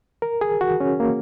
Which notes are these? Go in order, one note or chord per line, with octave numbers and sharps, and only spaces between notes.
A#4
G#4
F#4
C#4
A#3